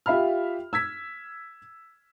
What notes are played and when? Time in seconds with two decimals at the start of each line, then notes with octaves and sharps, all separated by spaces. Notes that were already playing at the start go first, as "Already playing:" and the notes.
0.06 F4 G4 E5 F5 B5 F6
0.73 E6 G#6 B6